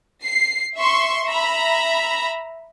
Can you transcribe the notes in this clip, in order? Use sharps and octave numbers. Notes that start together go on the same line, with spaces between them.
C7
E5 C6 C#6
E5 A#5 B5